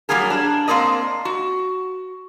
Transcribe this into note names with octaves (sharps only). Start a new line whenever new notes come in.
F#3 G3 A#3 G#4 A#4
D4
A#3 C4 A#4 D5 D#5
F#4